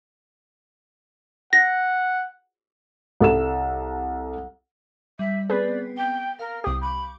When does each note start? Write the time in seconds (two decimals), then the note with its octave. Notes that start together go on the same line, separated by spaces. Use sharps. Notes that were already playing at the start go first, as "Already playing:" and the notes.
1.53 F#5 A#6
3.21 C2 A4 E6 E7
5.19 G3 E5
5.50 B3 C4 G#4 B4 D5
5.98 G5 G7
6.39 A#4 F5
6.64 C2 G4 D#6
6.82 B5 C#6 D6 G6